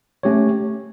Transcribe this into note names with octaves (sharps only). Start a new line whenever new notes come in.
A3 C#4 G4 C#5